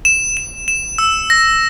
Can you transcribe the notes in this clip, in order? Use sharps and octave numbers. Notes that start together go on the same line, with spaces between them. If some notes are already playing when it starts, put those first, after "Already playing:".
E7
E7
E7
E6
A#6